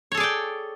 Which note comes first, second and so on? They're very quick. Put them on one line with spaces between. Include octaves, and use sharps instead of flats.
C#5 A4 G#4 D5 G5